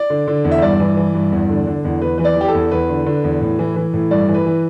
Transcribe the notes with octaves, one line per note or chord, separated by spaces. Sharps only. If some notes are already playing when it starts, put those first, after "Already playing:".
Already playing: D5
D3
D3
E2
E5
G2 D5
E3
E3
G2
E2
D3
D3
E2
E2 B4
E3 B4
D5
E3 G4
A4
E2
E2 B4
D3
D3
E2
A2
E3
E3
A2
G2 D5
E3
B4
E3